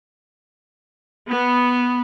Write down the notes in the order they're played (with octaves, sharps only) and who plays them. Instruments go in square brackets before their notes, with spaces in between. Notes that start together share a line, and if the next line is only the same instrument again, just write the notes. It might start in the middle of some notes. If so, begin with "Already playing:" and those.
[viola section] B3